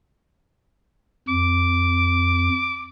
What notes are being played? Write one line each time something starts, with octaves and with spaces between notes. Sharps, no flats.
F2 D6